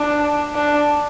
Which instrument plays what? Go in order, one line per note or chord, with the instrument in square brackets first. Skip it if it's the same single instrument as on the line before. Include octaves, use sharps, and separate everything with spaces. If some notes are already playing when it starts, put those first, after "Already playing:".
Already playing: [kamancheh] D4
D4